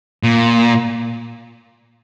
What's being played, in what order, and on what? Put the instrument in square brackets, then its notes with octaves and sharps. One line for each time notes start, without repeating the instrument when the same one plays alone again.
[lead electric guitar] A#2